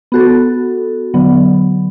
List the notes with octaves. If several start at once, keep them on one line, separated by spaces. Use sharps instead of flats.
B3 F#4 A4
D3 F#3 B3